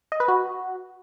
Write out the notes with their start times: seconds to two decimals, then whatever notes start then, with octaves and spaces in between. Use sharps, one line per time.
0.12 D#5
0.20 B4
0.28 F#4